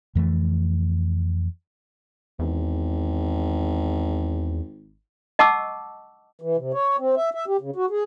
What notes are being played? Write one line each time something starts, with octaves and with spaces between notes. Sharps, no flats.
F2 E3 A3
G#1 E2
D#5 F#5 A5 C#6 D6 E6
E3
C3
C#5
C4
E5
E5
G4
C#3
F#4
G#4